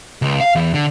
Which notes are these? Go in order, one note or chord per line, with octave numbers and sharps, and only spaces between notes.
C#2
F5
E2
D3